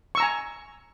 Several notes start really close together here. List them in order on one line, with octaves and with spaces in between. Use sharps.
C#6 E6 A#5 G#5